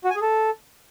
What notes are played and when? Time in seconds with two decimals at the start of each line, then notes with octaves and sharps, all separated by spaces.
0.04 F#4
0.10 G#5
0.16 G#4
0.22 A4